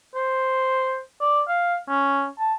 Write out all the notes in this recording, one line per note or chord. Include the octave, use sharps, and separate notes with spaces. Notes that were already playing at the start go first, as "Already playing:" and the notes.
C5
D5
F5
C#4
A5